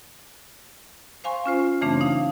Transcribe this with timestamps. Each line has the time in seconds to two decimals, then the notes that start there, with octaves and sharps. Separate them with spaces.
1.24 C5 F5 G#5 C6 C#6
1.46 C#4 F4 C5
1.81 F#2 C#3 E3 A3 C4 D4
2.01 D#4 F5